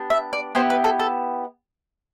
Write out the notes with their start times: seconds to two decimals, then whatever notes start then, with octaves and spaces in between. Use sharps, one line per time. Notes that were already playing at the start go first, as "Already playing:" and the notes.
Already playing: B3 D4 G4
0.10 E5
0.33 D5
0.55 B3 E4 G4 C5
0.70 B4
0.84 A4
0.99 A4